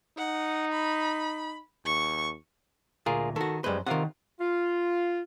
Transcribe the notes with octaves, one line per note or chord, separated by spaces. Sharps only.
D#4 F#5
B5
D#2 C#6
D2 A#2 F4 G#4 A#4
D#3 F#4 A4
F#2 G3 G#3 B4 C5
C3 D#3 F4 A#4 F#5
F4